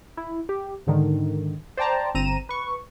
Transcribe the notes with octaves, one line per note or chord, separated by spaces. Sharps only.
E4
G4
G#2 D3 D#3
C5 D5 G5 A5 A#5
G1 C4 A#5 D#7 E7
B4 C#6